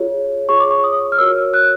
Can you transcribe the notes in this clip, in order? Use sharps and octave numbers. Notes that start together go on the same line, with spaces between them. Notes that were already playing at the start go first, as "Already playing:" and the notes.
Already playing: F4 G#4 C#5
F4 G#4 C#5 C#6
D6
C#6
D#6
F6
F#4 A#4 C#5 E6
F#6